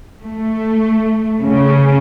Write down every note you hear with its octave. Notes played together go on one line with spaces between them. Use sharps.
A3
C#3